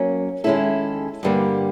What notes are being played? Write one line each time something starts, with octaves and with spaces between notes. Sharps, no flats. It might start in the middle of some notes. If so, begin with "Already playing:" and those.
Already playing: F#3 A#3 C#4
D#3 G#3 C#4 E4 A4
G2 D3 G3 A#3